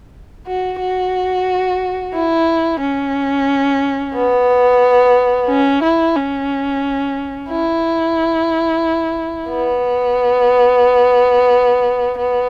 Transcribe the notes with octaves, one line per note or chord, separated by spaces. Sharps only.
F#4
F#4
E4
C#4
B3
C#4
E4
C#4
E4
B3
B3